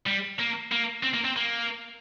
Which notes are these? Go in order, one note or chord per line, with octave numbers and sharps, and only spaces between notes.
G3
A#3
A#3
C4
A#3
C4
A#3